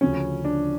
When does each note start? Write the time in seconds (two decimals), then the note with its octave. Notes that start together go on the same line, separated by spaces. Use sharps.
0.01 D2 C#3 F3 C#4
0.45 D4